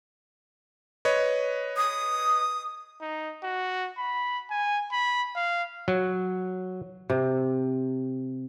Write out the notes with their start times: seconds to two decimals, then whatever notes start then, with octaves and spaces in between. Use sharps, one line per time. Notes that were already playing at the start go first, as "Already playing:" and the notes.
1.05 B4 C#5 D#5
1.77 D#6
3.01 D#4
3.43 F#4
3.98 B5
4.50 G#5
4.92 B5
5.35 F5
5.88 F#3
7.10 C3